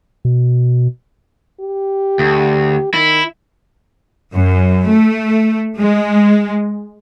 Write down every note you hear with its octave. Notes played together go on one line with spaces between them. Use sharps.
B2
G4
D2
D#3 E4
F#2
A3
G#3